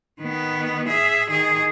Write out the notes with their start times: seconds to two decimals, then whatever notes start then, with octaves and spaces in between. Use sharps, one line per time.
0.21 D#3 B3
0.88 G#4 E5
1.31 D#3 G#4